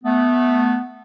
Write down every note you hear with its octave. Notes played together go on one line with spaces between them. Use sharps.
A3 B3